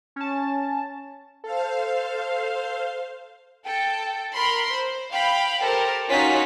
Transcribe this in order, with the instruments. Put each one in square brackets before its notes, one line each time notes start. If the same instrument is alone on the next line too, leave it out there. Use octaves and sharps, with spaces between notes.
[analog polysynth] C#4 A5
[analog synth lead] A4 [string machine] C5 F5
[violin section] A4 G5
A#4 B5 C6
C5
F5 G5 B5
G4 A4 A#4 C5
C#4 D#4 F4 F#4 B6